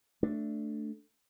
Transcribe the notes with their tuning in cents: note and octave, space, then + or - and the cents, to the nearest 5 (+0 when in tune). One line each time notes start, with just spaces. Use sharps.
A3 +0 D4 +0